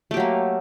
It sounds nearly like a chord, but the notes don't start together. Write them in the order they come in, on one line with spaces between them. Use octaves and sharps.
A3 G4 F#3 A#3